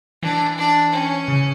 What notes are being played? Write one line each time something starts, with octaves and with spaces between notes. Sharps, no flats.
E3 D4
D4
C#4
C#3